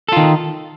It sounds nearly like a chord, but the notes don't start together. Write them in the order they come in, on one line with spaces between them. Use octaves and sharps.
A4 F4 D#3